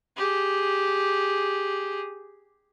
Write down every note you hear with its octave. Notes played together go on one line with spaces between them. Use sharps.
G4 G#4